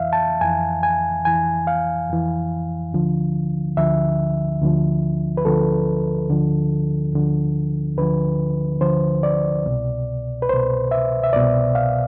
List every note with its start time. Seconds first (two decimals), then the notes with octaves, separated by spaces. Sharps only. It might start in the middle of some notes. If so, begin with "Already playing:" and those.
Already playing: F2 E3 E5 F5
0.13 A5
0.41 F2 E3 G#5
0.83 G#5
1.25 F2 E3 G#5
1.67 F5
2.10 F2 E3
2.93 D2 D3 F3
3.77 D2 D3 F3 E5
4.61 D2 D3 F3
5.37 B4
5.45 D2 D3 F3 A4
6.30 D2 D3 F3
7.13 D2 D3 F3
7.97 D2 D3 F3 B4
8.81 D2 D3 F3 C5
9.23 D5
9.66 C2 B2
10.42 B4
10.49 C2 B2 C5
10.91 E5
11.23 E5
11.33 C2 B2 D5
11.75 F5